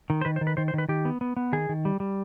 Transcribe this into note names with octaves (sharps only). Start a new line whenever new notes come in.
D#3
C5
D#3 B4
C5
D#3
B4
D#3 C5
C5
D#3 B4
D#3 G4
B3
B3
B3
D#3 G#4
D#3
G3
G3